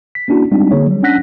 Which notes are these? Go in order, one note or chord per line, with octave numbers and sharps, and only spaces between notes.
B6
A#3 C#4 D4 E4 F#4
G3 G#3 C4 D4 D#4
D3 A#3 G#4 C#5
F#3 G3
C#4 D4 F#5 F#6 A#6 B6